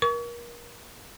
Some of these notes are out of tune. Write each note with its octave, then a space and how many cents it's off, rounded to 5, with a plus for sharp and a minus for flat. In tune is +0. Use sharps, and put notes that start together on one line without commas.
A#4 +35 C#6 +40